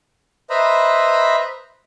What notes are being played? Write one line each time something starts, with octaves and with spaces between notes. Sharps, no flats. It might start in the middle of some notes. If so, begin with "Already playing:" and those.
B4 C5 D#5 E5 A#5 B5